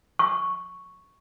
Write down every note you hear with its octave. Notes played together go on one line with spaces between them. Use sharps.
C#6